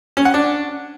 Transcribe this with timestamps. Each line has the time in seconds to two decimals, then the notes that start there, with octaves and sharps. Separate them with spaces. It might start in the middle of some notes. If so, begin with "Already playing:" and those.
0.17 C#4
0.25 F#5
0.34 D4